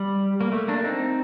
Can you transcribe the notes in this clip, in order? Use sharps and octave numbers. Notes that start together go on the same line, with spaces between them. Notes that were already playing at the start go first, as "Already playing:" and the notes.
Already playing: G3
A#3
A3
A#3 D4
C4 D#4